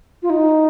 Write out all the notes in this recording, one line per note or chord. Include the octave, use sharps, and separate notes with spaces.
F4
D#4